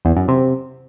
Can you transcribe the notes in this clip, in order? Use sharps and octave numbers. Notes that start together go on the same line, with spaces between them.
E2
F#2
C3